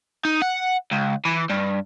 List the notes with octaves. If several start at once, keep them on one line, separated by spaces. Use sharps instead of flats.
D#4
F#5
C#2
E3
G2